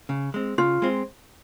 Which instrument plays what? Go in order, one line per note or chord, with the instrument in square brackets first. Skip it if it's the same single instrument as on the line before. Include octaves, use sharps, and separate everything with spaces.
[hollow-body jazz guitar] C#3
G#3 C4
[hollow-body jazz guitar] C#3 [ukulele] F4
[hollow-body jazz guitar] G#3 C4